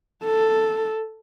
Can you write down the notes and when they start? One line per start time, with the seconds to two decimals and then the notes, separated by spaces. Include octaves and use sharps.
0.25 A4